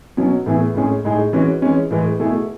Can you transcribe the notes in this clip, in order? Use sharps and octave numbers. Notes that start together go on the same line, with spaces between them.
B2 F#3 C#4
A2 E3 B3 E4 G#4
A2 G#3 C#4 G#4
A2 G#3 D#4 G#4
E3 G#3 C#4 F#4
E3 G#3 C#4
A2 E3 G#3
B2 A3 E4 G#4